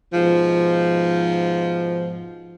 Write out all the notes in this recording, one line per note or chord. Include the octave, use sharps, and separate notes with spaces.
G#2 B2 F3